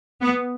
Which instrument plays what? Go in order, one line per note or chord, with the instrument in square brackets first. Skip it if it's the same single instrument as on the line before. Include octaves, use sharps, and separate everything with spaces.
[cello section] B3